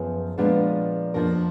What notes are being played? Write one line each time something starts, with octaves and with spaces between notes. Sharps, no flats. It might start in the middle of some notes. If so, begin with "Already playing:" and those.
Already playing: F#2 F3 B3 G#4
A#2 F3 G#3 B3 D4
F2 F3 A#3 D4 A#4